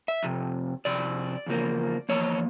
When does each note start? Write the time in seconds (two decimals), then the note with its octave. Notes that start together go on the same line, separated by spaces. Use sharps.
0.08 E5
0.23 F2 C3
0.85 F2 C3 D5
1.46 E2 C#3 F3 A#3
2.09 E2 C#3 F3 A#3 C#5